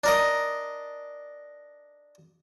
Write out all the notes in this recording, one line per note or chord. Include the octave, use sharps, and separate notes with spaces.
D4 A#4 D#5